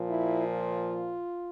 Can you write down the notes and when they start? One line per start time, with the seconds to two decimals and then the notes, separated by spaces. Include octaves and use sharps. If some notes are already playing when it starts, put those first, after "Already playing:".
Already playing: A#2 F3
0.08 E4
0.48 F4